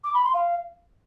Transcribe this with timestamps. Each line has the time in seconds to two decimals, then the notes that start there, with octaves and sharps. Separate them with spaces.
0.04 D6
0.14 B5
0.24 C6
0.34 F5